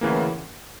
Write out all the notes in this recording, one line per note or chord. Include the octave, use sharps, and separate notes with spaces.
D2 C#3 E3 A#3